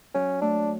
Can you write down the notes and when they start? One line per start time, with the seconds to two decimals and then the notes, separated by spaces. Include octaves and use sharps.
0.14 F#3 C#4
0.42 A3 D4